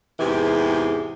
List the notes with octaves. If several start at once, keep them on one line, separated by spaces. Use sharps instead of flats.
E2 G#2 C3 E3 G4 G#4